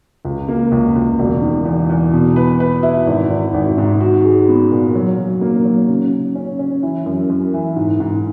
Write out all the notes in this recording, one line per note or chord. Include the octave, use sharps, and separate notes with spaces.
C#2
A#3
C#2
C#2
E1
D#3
E2
E2
B2
B4
B4
E4
G#1
G#1
G#1
G#2
F#4
G#3
B3
A#2
F#3
F#3
A#3
F#3
C#3
C#3
C#4
C#4
E3
F#2
F#2
E3
G#2
G#2